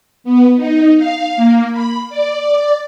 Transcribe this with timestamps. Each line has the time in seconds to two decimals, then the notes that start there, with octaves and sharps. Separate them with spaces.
0.24 B3
0.56 D#4
0.97 F5
1.37 A#3
1.71 B5
2.09 D5